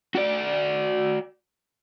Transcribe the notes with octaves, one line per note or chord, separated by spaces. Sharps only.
F#4 D5